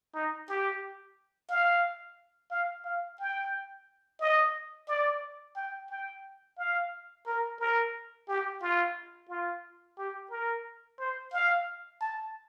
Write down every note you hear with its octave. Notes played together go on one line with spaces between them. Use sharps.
D#4
G4
F5
F5
F5
G5
D#5
D5
G5
G5
F5
A#4
A#4
G4
F4
F4
G4
A#4
C5
F5
A5